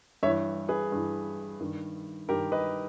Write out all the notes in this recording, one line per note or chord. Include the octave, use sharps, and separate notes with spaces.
G2 E3 C#5 E5
G#4 B4
G2 E3
G2 D#3
G2 D#3 G4 A#4
B4 D#5